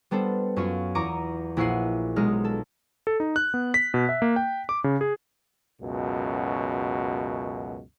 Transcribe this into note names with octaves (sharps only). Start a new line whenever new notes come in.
G3 B3 D4 A4 C5
F#2 C#4 F4 C#5
E2 A#5 C#6 D6 D#7
A#1 E4 F#5 C#6 C7 D#7
B1 G#3 D#4 F6
A4
A4
D#4
F#6
B3
B6
B2
E5
A#3
G5
D6
C#3
G#4
C#2 F#2 B2